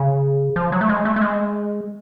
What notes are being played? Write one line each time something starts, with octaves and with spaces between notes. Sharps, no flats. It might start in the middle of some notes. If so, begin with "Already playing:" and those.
Already playing: C#3
F3
F#3
A3
G#3
A3
A3
G#3